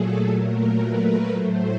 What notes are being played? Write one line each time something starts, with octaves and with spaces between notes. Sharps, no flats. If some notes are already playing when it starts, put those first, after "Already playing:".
Already playing: A#2 F#3 A3 G#4 A4
A#2 F#3 A3 A#4
B4
A2 F#3 A3 C5